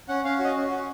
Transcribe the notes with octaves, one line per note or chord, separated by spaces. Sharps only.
C#4 F#5
C#4 F5
F#4
D#5
C#4
F#4